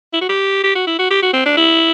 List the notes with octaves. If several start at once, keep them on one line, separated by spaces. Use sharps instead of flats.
E4
F#4
G4
G4
F#4
E4
F#4
G4
F#4
C4
D4
E4